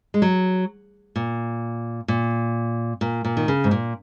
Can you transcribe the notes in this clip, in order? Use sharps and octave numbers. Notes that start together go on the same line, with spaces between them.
G#3
F#3
A#2
A#2
A#2
A#2
D#3
C#3
G#2
A#2